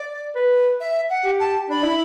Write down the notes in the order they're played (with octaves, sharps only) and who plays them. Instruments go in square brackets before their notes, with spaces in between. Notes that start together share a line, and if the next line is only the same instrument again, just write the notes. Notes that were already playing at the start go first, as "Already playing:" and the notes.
Already playing: [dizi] D5
[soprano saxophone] B4
[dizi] E5
F#5
[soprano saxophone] G4
[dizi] A5
[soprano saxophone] D4 [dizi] B5
[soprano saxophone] E4